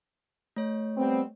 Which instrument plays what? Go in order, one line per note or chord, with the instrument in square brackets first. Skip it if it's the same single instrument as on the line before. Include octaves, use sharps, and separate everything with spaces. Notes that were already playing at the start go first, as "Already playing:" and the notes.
[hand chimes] A3 C#5
[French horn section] G3 B3 C4